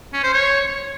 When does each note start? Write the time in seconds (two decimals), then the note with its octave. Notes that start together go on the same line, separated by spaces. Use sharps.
0.13 C#4
0.24 C5
0.34 C#5